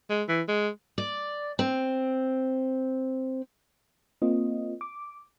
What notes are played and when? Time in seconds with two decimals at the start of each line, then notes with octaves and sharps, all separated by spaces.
0.10 G#3
0.29 E3
0.48 G#3
0.98 D5
1.59 C4
4.22 A#3 C4 F4 D#5
4.81 D6